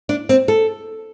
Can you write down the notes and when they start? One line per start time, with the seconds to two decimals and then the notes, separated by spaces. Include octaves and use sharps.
0.09 D4
0.29 C4
0.48 A4